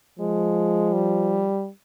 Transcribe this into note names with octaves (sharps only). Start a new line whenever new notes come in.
F3 G#3
G3